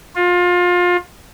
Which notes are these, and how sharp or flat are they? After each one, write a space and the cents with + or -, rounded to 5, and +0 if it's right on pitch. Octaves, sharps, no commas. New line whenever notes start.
F4 +25